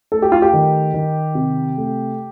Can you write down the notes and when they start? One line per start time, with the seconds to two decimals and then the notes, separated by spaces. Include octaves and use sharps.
0.12 A3 A4
0.22 G4
0.32 F4
0.42 G4
0.53 D#3
0.94 D#3
1.35 C3
1.77 A3